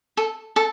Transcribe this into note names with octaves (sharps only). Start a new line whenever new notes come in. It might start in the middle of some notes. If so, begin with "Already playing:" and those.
A4
A4